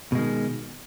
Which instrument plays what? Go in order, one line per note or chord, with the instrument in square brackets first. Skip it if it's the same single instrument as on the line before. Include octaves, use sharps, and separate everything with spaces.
[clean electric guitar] B2
G#3
D#3